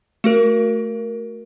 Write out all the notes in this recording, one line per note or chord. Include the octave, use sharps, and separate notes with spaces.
A3 F#4 A#4